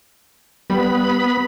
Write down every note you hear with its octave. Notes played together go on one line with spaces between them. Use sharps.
G3 B3 B5